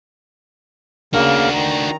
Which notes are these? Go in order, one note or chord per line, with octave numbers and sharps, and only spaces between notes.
C#3 A#3 D4 F#4 A#4
D#3 A#5